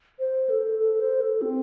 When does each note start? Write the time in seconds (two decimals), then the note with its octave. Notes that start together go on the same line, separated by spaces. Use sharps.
0.19 C5
0.49 A4
0.80 A4
1.00 C5
1.21 A4
1.42 C4